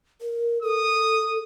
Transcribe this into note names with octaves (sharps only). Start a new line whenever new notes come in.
A#4
A4 D#6